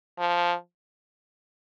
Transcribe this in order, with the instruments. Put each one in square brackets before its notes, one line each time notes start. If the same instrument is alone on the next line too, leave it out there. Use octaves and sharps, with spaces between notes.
[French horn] F3